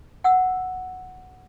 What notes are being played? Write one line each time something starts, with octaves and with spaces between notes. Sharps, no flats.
F#5 E6